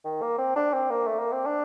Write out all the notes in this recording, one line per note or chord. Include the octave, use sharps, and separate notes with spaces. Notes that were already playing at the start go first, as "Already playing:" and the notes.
D#3
A#3
C4
D4
C4
A#3
A3
A#3
C4
D4